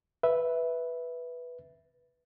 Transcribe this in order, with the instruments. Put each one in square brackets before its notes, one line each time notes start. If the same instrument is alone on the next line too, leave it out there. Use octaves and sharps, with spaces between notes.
[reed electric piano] B4 E5